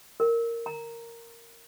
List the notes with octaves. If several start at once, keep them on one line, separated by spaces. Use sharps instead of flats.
A#4
A#5